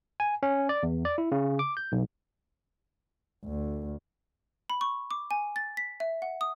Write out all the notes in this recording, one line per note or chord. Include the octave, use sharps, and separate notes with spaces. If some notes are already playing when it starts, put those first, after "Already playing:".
G#5
C#4
D5
E2
D5
E4
C#3
D6
G6
B1
D2
B5
C#6
D6
G#5
A6
B6
E5
F#5
D#6